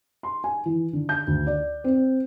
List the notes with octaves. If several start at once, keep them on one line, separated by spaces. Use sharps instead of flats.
C6
G#5
E3
D3
G6
D2
D5
C4